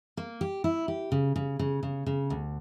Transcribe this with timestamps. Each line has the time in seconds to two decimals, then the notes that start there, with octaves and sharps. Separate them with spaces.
0.17 A#3
0.41 G4
0.64 E4
0.88 G4
1.12 C#3
1.36 C#3
1.59 C#3
1.83 C#3
2.06 C#3
2.30 D2